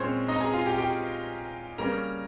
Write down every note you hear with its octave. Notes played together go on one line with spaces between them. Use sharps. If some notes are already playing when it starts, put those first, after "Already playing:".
Already playing: A#2 G#3 C4 C#4 C5 C#5
D#4 D#5
A#5
G#4 G#5
F4 F5
G4 G5
G4 G5
C#3 G3 A#3 C#4 A#4 A#5